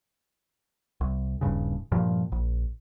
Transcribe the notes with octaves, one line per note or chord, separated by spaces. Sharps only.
C2
D#1 G#1 G2 C#3
G2 A#2 F3
A#1